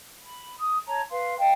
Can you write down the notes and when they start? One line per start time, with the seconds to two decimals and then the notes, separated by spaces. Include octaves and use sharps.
0.20 B5
0.59 D#6
0.87 C#5 A5 A#5
1.10 B4 F5 C6
1.39 D#5 F5 G5 A5